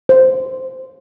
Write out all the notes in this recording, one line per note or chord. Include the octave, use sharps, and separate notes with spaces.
C5